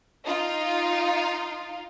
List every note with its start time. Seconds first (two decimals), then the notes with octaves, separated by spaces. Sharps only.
0.25 D#4 F4 F5